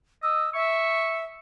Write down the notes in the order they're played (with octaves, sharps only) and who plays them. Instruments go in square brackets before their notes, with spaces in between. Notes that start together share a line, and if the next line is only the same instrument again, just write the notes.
[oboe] D#5 [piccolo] E6
[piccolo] E5 [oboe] C#6